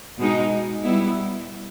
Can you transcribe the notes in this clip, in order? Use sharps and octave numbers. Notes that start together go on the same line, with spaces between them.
B2 G#3 D#4
G3 B3 E4